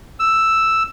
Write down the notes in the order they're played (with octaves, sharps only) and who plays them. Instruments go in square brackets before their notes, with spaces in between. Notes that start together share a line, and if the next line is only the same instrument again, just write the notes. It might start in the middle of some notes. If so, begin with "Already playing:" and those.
[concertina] E6